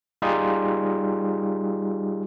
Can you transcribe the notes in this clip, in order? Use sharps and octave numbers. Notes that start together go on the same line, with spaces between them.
G3 D#4 F4 G4 G#4